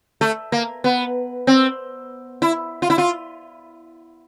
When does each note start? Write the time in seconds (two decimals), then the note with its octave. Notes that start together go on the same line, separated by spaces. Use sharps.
0.21 A3
0.52 A#3
0.84 B3
1.47 C4
2.42 E4
2.82 F4
2.90 E4
2.98 F4